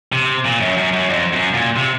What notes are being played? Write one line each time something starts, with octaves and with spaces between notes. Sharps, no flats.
C3
A#2
F#2
F#2
F#2
F2
F#2
A#2
C3